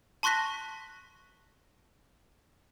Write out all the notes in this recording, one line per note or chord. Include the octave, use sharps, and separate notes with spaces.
A5 C6 C#6 F#6 A#6 B6